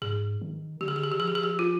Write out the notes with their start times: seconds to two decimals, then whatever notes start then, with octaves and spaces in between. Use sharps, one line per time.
0.02 G#2 G#4
0.41 D#3
0.81 D3 G4
0.88 G#4
0.96 G4
1.04 G#4
1.11 D#3 G4
1.19 F3 G#4
1.28 G4
1.35 G#4
1.43 G4
1.59 F4